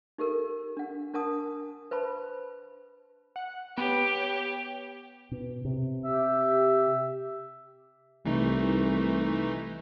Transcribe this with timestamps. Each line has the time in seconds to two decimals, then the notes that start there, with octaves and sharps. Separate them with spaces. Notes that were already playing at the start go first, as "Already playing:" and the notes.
0.18 D#4 G4 A4 A#4
0.77 D4 F#5
1.14 D4 A#4 F#5 A5 D#6
1.91 B4 C5 A5 B5
3.36 F#5
3.78 B3 G4 C#5
5.31 B2
5.65 C3
6.05 G4 E5
8.26 C2 E3 A3 D#4